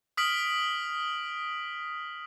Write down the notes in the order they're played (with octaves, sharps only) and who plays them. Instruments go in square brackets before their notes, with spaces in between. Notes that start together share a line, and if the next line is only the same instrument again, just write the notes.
[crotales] D#6 F6 B6 D7 F#7